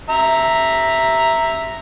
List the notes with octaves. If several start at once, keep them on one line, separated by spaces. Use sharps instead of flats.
E5 A#5